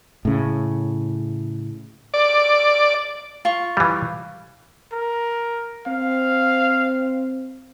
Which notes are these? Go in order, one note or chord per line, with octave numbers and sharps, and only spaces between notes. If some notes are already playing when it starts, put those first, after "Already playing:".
A2 C#3
D5
F4 C#6
E3 G3
A#4
C4 F5